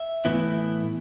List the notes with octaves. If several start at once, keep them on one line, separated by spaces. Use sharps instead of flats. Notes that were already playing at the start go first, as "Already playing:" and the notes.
Already playing: E5
A2 E3 B3 E4